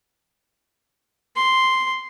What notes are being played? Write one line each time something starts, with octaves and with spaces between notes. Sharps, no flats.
C6